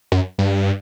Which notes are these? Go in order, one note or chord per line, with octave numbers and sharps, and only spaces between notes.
F#2
G2